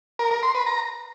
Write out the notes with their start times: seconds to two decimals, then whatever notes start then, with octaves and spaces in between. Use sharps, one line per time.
0.19 A#4
0.31 A#4
0.43 C6
0.55 B4
0.66 A#5